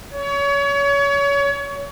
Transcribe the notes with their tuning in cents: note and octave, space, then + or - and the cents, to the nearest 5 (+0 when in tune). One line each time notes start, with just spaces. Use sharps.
C#5 +30